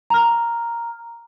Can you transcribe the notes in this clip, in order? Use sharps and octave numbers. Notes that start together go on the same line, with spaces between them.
A#5 F6